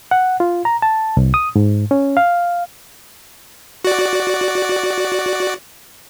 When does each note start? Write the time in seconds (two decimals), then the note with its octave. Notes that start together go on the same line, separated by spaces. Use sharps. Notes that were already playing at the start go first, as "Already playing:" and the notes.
0.11 F#5
0.40 F4
0.65 A#5
0.82 A5
1.17 C2
1.34 D#6
1.56 G#2
1.91 C#4
2.17 F5
3.85 F#4 D5